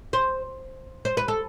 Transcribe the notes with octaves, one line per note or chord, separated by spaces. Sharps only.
C5
C5
B4
A4